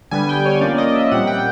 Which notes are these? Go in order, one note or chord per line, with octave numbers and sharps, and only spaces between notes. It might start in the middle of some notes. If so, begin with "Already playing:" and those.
D3 G3 B3 G#5
G5
C#5
F3 A#3 C#4 D5
D#5
E5
A#2 G3 C4 F#5
G5